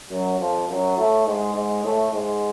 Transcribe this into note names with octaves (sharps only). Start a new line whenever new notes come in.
F#2 F#3
F2 F3
F#2 F#3
A2 A3
G#2 G#3
G#2 G#3
A2 A3
G#2 G#3